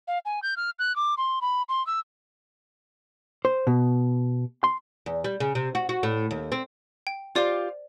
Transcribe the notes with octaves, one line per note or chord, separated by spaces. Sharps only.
F5
G#5
G6
F6
F#6
D6
C6
B5
C6
E6
C5
B2
C6
E2
G3
C#3
C3
F#4
F#4
A2
D#2
C4
G5
F4 G4 C5 D5 F5